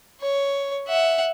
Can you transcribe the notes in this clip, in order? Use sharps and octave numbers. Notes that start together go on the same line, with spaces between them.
C#5
E5 F#5